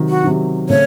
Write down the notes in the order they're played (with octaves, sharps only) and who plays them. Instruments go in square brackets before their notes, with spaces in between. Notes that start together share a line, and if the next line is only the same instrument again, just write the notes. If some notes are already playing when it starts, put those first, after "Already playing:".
Already playing: [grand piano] C3 D#3 F#3
[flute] F#4
[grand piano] C3 D#3 F#3
[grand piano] C#3 A3 C4 [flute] C#5